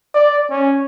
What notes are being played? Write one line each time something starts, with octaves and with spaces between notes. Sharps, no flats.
D5
C#4